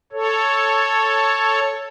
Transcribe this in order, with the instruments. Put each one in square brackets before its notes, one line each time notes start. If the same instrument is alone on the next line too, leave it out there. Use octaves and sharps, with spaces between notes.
[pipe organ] A4 C#5